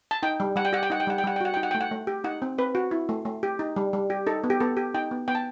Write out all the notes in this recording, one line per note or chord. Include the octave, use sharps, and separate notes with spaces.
A5
D#4 G5
G3
G3 F#5
G5
G4 F#5
G5
D#4 F#5
G5
G3 F#5
G5
G3 F#5
G5
F#4 F#5
D#4 G5
F#5
A3 G5
F#5
A3
G4
D#4 F#5
C4
C4 B4
F#4
E4
A3
A3
G4
D#4
G3
G3
G4
D#4 A4
B3
G4
B3 A4
G4
D#4 G5
B3
B3 G5
A5